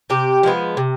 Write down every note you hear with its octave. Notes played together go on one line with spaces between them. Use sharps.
C3 G4
F3 G#3 B3
C3